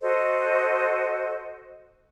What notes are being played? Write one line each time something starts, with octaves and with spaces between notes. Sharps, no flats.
F#4 A4 C5 D#5